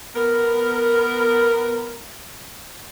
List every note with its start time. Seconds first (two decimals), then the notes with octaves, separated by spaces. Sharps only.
0.15 B3 A#4